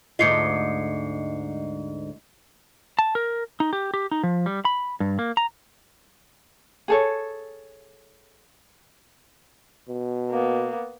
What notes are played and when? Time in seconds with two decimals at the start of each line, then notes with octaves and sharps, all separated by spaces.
0.19 D2 G#2 F4 D#5 C7 C#7
2.99 A5
3.15 A#4
3.60 D#4
3.73 G4
3.94 G4
4.11 D#4
4.23 F3
4.46 G3
4.65 B5
5.00 G2
5.19 A#3
5.37 A#5
6.88 G#4 A4 C#5
9.88 B2
10.30 A#3 B3